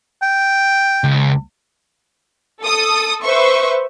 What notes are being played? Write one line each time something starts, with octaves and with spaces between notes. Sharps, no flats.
G5
C#2
A4 D#6
B4 C5 E5 C#6